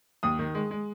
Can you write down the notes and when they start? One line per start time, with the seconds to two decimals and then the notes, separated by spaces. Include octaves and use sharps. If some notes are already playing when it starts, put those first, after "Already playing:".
0.23 D#2 D#6
0.39 D#3
0.55 G#3
0.71 G#3